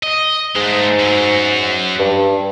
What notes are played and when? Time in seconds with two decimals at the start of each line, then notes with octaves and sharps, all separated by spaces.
0.03 D#5
0.56 G#2 G#3 A3
1.00 F#2 F#3
1.99 G2